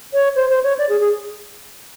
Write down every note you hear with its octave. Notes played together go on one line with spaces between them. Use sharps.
C#5
C5
C5
C#5
D5
G#4
G#4